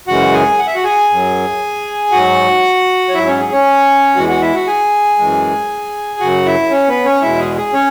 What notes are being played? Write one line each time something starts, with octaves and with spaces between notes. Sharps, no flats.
F#2 C#3 E3 G#3 F#4 F#5
G#4 G#5
F#5
E5
F#4 F#5
G#4 G#5
F#2 F#3
G#2 F#3 F#4 F#5
C#5
G#2 F#3 E4 E5
C#4 C#5
G#4
C#4 C#5
E2 E3 G#3 F#4 F#5
F#4 F#5
E4 E5
F#4 F#5
G#4 G#5
F#2 E3 G#3
F#2 C#3 F#3 F#4 F#5
E4 E5
C#4 C#5
B3 B4
C#4 C#5
E2 B2 G#3 E4 E5
G#4
G#4
C#4 C#5